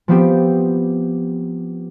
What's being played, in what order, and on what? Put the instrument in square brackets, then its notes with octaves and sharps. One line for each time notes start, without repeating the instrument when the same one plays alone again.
[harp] F3 B3 C4 G4